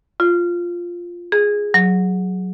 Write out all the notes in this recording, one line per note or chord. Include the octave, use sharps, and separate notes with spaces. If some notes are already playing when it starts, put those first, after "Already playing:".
F4
G#4
F#3